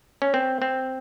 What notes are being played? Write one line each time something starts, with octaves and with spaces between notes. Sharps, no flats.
C#4
C4
C4